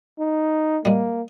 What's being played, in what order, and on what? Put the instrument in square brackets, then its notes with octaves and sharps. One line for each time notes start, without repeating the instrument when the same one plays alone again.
[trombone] D#4
[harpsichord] G3 G#3 [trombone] A#3